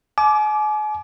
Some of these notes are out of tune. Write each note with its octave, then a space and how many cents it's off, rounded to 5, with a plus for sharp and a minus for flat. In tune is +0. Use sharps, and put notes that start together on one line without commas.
G#5 +40 D6 +0